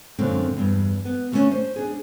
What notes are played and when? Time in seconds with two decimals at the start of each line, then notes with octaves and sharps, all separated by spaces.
0.19 F#2 A#2 D3 A3 C4
0.57 E2 G2
1.05 B3
1.32 D3 G3 A3 A#3 C#4 D4
1.51 C5
1.76 D4 G#4